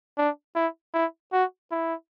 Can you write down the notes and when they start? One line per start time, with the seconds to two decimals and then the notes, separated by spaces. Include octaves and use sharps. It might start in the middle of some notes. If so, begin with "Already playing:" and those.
0.18 D4
0.56 E4
0.94 E4
1.33 F#4
1.71 E4